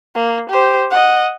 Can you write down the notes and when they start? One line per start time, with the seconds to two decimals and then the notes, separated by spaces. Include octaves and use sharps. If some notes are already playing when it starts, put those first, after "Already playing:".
0.15 A#3
0.50 G4 C5
0.91 D#5 F#5